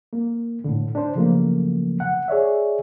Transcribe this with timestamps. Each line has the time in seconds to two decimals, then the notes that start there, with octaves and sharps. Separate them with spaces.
0.13 A#3
0.64 A2 D3
0.95 D4 C5
1.16 C#3 F3 F#3 A3 A#3
2.00 F#5
2.28 G#4 C#5 D5 E5